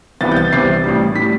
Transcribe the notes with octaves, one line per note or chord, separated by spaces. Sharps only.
C2 C3 E3 B3 A6
G6
A6
C2 C3 E3 B3 C7
A1 A2 G3
A2 G3 B6